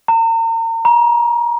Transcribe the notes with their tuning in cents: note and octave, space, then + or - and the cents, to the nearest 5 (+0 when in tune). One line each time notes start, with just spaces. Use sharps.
A#5 -40
A#5 +30